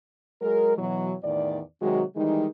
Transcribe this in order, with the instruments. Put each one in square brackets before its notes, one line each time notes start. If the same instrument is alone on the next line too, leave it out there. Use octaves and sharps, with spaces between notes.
[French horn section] F#3 G#3 G#4 A#4
B2 E3 F#3
E2 A2 D#3 D5
C3 D#3 F#3 G#3 F#4
D#3 E3 G3 G#3 D#4